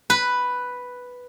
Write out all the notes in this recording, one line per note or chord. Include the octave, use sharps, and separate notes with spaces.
B4